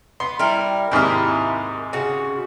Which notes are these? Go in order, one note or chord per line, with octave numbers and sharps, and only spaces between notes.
B3 C6
G3 E4 A#4
D#2 G#2 C3 E4 A#4
C#3 F#4